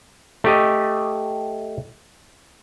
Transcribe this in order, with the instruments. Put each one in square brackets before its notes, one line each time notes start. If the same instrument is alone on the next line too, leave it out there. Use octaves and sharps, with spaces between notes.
[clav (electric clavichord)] A3 G4 D#5